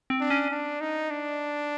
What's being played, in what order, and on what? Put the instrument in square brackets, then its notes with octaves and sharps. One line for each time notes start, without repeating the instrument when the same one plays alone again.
[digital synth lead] C4
[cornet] D4
[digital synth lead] C#4
[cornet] D4
D#4
D4